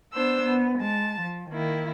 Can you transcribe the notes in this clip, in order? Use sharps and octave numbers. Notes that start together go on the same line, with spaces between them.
B3 D4 C5 E6
B3
G#3 A5
F3
D#3 A#3 E4